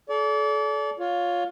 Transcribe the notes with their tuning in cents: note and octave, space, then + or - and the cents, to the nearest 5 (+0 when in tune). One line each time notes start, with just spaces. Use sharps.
A4 -35 D5 -35
F4 +15 C#5 +20